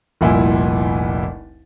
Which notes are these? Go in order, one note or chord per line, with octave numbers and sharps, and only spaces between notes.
F1 C2 A#2 E4 G#5